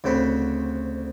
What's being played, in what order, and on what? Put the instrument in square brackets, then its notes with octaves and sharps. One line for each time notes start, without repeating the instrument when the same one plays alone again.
[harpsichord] D2 C#3 C4 C5 F#5 B5